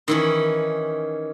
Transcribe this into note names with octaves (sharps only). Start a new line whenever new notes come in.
D#3 E3 C#4